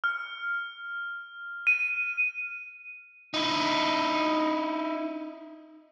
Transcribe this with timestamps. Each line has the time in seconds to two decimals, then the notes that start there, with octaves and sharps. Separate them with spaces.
0.04 F6
1.67 D#7
3.34 D#4 E4